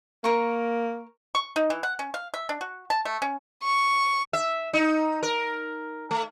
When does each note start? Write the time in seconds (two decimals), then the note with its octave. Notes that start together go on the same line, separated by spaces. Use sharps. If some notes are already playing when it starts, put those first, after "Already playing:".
0.24 A#3 A#4 C#6
1.35 C#6
1.56 D#4
1.70 E3
1.83 F#5
1.99 C#4
2.14 F5
2.34 E5
2.49 D4
2.61 F#4
2.90 A5
3.05 A3
3.22 C#4
3.64 C#6
4.33 E5
4.73 D#4
5.23 A#4
6.11 A3